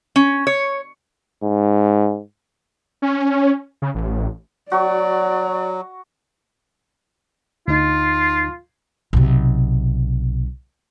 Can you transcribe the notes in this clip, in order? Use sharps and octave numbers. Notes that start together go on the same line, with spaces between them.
C#4
C#5
G#2
C#4
C#3
A1
F#3 F#4 D5 C#6
D2 D#4 F4
B1 C3